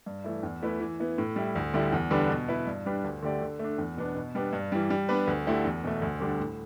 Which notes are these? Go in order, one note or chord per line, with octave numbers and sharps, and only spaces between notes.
G2
E3 A3 E4
E2
E3 A3 E4 B4
E3
B3 E4
A2
G3 E4
D2
D3 G3 E4
E2
D3 G3 D4 B4
B2
B3 E4 B4
G2
G3 D4 B4
D2
D3 A3 G4 D5
D3
A3 D4
E2
B2 B3 D4
B2
G3 B3 D4
G2
E3 G3
G3
B3 D4 B4
D2
D3 A3 E4 G4
E2
B2 A3
D2
D3 G3 D4 A4
A2